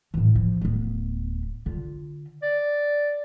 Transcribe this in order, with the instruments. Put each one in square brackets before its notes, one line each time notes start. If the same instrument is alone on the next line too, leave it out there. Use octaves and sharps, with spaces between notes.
[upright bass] A2 E3
F3
D1 B3
D3 F4
[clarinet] D5